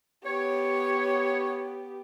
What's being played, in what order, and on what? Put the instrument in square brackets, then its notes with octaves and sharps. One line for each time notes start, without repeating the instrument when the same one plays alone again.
[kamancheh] B3 G4 [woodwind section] C#5